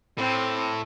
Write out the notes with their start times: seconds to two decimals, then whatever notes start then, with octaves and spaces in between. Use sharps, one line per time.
0.18 A2 C4